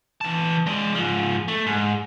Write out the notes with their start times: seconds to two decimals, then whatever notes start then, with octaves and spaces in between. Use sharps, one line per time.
0.21 E3 A5
0.66 G#3 D5
0.95 G#2 F3
1.48 A3
1.66 G#2